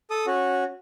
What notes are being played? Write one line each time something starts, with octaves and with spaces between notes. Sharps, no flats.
A4 D#6
C#4 F#4